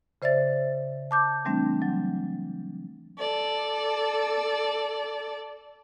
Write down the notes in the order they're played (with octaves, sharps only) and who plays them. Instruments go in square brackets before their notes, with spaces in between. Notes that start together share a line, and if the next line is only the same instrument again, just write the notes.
[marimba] C#3 C5 D5 E5 A6
A5 D6 G6
E3 G3 A3 C4 D4
F#3
[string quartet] A4 D5